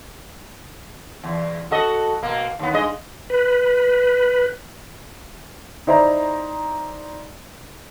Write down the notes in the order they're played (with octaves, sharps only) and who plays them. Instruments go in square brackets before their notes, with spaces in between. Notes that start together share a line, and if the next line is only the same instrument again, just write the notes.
[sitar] E2
F#4 A4 D#5
B2 A#3
D#2 B3
G2 G#3 D#5
[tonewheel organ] B4
[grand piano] D#4 E4 C5 D5 A#5